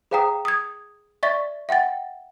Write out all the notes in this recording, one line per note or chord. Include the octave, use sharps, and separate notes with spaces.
G#4 C5 F5 G5 A#5 D#6
D#6 G#6
D5 E5 C#6 A6 B6
E5 F#5 G5 A6